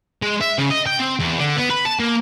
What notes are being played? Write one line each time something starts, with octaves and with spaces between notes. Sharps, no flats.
G#3
E5
C#3
D#5
G5
C4
E2
D3
B3
B4
A5
A#3